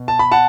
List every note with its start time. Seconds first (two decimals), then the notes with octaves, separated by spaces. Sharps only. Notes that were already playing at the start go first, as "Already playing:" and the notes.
Already playing: B2
0.08 A5
0.19 B5
0.32 F#5 A5